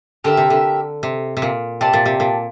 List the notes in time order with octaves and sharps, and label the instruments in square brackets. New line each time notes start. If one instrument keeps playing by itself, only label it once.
[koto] D3 [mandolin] G4 A#4 E5
[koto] C3
D3
C3
C3
A#2
[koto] C3 [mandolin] G4 D5 A5
[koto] A#2
C3
A#2